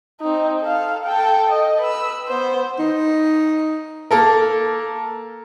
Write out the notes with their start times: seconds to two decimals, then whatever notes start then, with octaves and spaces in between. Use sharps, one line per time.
0.21 C4 D#4
0.61 A4 F5
1.05 A4 G5
1.49 D#5
1.81 B4 E6
2.29 B3 C5
2.79 D#4
4.11 A#3 A4 A#4